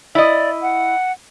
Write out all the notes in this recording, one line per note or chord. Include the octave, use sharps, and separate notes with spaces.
E4 D5 D#5
F#5